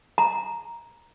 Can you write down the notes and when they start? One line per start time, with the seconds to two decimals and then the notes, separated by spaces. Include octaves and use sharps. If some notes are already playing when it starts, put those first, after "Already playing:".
0.18 A#5